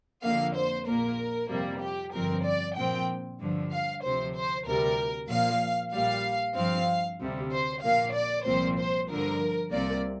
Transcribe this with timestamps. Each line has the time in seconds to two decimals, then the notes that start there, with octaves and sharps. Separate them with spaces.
0.23 F2 D3 A#3 F5
0.55 C5
0.87 A#1 A#2 A#3 A#4
1.49 F2 C3 G3 A#3
1.82 G4
2.13 G1 F2 F3 C4 A#4
2.45 D5
2.76 A#1 A#2 F3 C4 G5
3.40 G2 D3 F3
3.72 F5
4.03 D2 C3 F3 C5
4.35 C5
4.66 D2 C3 G3 A#4
5.29 A#1 A#2 F3 A#3 F5
5.93 A#1 A#2 G3 F5
6.55 G2 F3 C4 F5
7.20 D2 C3 G3
7.51 C5
7.82 A#1 A#2 A#3 F5
8.13 D5
8.45 C2 A#2 F3 C4 C5
8.77 C5
9.08 G2 D3 F3 A#4
9.72 C2 C3 A#3 D5